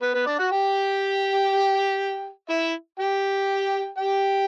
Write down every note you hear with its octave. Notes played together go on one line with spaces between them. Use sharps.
B3 B4
B3 B4
D4 D5
F#4 F#5
G4 G5
E4 E5
G4 G5
G4 G5